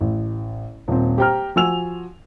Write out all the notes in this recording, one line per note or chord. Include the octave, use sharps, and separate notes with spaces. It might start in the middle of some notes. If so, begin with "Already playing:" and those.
A1
D#1 C4
G4 C5 G5 A#5 F6
F3 F#4 G#5 E6 F7